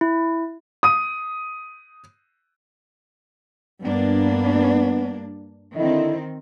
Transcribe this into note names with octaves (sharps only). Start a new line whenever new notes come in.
E4
D#6 D#7
G2 A#3 B3 D4
D3 D#3 C4 E4 D#5